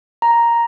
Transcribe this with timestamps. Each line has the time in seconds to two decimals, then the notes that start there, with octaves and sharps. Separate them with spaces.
0.22 A#5